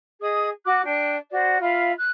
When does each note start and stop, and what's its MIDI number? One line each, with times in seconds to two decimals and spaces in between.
0.20 0.49 68
0.20 0.49 75
0.20 0.49 87
0.64 0.81 66
0.64 0.81 86
0.64 0.81 90
0.84 1.15 62
0.84 1.15 79
1.31 1.57 66
1.31 1.57 72
1.31 1.57 74
1.61 1.91 65
1.61 1.91 76
1.61 1.91 77
1.61 1.91 83
1.97 2.09 90